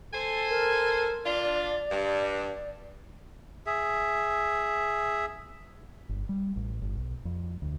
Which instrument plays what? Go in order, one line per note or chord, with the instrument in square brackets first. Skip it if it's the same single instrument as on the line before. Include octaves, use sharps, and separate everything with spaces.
[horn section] A4 C5 G#5
[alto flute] A#4
[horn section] D4 F4 [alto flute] D5
[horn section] G2
[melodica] G#4 E5
[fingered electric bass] G1
G3
A1
G1
B1
F2
D2